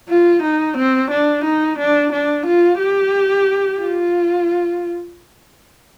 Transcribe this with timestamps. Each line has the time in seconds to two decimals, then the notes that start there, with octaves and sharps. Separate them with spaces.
0.10 F4
0.43 D#4
0.77 C4
1.10 D4
1.44 D#4
1.78 D4
2.12 D4
2.46 F4
2.80 G4
3.80 F4